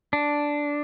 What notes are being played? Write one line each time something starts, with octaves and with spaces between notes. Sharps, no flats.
D4